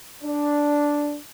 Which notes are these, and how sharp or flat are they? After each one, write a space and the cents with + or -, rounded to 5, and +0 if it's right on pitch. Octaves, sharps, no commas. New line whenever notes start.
D4 -5